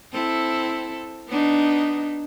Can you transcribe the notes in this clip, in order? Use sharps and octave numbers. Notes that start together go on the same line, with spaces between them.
C4 E4 A4
B3 D4 D#4